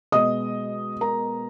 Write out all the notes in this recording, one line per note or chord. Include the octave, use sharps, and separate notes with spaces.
B2 G#3 B3 D#5 D#6
A#4 A#5